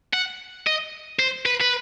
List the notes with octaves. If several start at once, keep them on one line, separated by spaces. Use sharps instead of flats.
F#5
D#5
C5
B4
B4